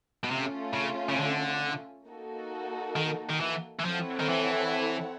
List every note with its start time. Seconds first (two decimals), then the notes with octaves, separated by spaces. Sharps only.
0.24 B2
0.30 C3 A3 C#4 F4
0.74 C#3
1.09 C#3
1.19 D3
2.08 A#3 D#4 F#4 A4
2.96 D#3
3.30 D#3
3.40 E3
3.80 E3
3.84 F3 C4 E4 A4 C#5 F#5
4.20 D#3
4.29 E3